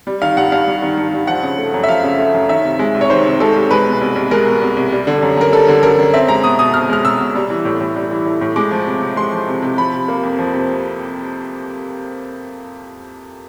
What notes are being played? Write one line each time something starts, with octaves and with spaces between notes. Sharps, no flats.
G3
D#3 F5
G2 F#5
G2 F5
G3
D#3
G2
G2
F3 F#5
C#3
A3
F#2
E5
F3 F5
C#3
A3
F#2
D#3 E5
C3
G#3
C2
C#5
D#3 C5
C3
G#3 A4
C2
G#3 B4
B2
C2
C2
G#3 A#4
B2
C2
C2
G3
D3
F#2
F#2 A#4
G3 A4
D3
F#2 A#4
F#2
C4 E5
G#3 A#5
B2 D#6
B2 D#6
C4 F6
G#3 F6
B2 E6
B2
G3
E3
A2
A2
G3
E3
A2
A2
G#3 D6
F3
C3
C3
G#3 C6
F3
C3
C3
F3 B5
C3
A#3
F2
F3
C3